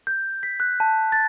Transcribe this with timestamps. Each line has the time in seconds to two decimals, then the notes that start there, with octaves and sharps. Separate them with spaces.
0.07 G6
0.43 B6
0.60 F#6
0.80 A5
1.12 A6